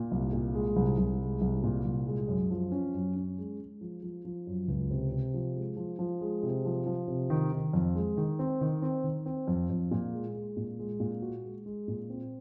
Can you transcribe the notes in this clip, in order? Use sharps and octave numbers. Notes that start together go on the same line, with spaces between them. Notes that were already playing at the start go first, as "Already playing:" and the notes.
Already playing: A#2
C2
A#2
G#3
C2
C2
G#3
C2
A#2
C2
G#3
F#2
F3
C#4
F#2
C#4
G#3
G#3
F3
F3
F3
F#2
C#2
C3
C3
F3
G#3
F3
F3
G#3
C3
F3
F3
C3
D#3
D#3
F2
G#3
D#3
C4
D#3
C4
D#3
C4
F2
F2
A#2
G#3
G#3
A#2
G#3
A#2
F#4
G#3
G#3
A#2
C4